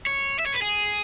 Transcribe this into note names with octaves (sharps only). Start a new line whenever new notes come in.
C#5
E5
C#5
B4
G#4